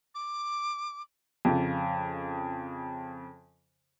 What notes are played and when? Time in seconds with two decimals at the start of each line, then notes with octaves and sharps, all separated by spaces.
0.15 D6
1.45 F2 C#3